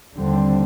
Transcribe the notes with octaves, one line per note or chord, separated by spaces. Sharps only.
D#2 D3 G3 C4